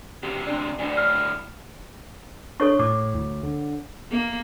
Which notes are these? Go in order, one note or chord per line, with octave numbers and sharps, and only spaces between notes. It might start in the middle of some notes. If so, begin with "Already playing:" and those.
D2 C3 G4
G#3 D4
D2 A2 D4 D5 G#5
F6
D4 A4 C#5 C#6
A2 D6
D2
D3
A#3